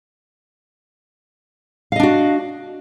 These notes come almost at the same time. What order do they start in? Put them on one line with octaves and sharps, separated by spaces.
F5 D#5 D4 F#4